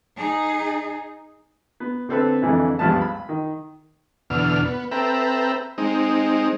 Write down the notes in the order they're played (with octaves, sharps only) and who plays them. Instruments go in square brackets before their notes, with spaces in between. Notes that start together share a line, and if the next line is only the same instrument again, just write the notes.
[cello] D#4 G#4
[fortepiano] B3
D3 C4 A4 B4
F2 D3 E3 G#3
C#2 G2 F3 B3 A5
B5
D#3
[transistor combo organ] E2 B2 D3 F6
B3
C4 A4 B4 E5 G5 A#5
G#3 C4 D#4